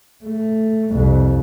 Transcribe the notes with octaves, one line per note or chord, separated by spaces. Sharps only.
A3
C2 F2